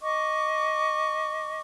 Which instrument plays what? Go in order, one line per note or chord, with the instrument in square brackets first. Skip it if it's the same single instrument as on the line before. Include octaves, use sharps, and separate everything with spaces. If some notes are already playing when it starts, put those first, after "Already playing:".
[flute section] D#5 C#6 D6